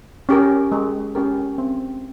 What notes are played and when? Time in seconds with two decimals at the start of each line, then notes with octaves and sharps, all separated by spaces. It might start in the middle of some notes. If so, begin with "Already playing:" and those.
0.29 C#4 G4 A#4
0.72 G#3
1.15 C#4 G4 A#4
1.58 C4